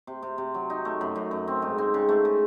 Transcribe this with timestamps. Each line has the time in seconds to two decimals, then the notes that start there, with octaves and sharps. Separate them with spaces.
0.07 C3
0.22 C3
0.38 C3
0.54 F#3
0.70 D#4
0.85 A3
1.01 F#2
1.16 F#2
1.31 F#2
1.48 C4
1.62 G#2
1.78 C4
1.94 C#3
2.09 A3
2.25 C#3